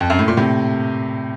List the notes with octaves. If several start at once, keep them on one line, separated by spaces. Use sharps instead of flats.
F2
F#2
A2
A#2
A2 C3